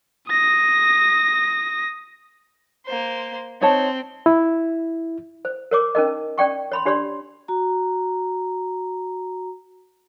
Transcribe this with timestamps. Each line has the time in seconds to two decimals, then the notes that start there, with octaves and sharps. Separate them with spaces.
0.29 D#6 A#6
2.86 A#3 C5
3.61 C4 D#4 C#5 A5
4.26 E4
5.45 C5
5.71 A#4 C#5 D6
5.95 C#4 D#4 A#4 D#5
6.38 C#4 D5 G5 C#6
6.72 C#5 B5 C6
6.85 D4 G4 C#5 D5 C6
7.48 F#4 A#5